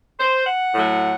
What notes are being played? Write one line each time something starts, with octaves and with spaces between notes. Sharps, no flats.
C5
F#5
A2 F#3 A3